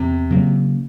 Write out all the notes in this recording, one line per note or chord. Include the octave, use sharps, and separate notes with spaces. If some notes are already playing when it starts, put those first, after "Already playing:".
Already playing: E2 C3
C#3 F#3 A#3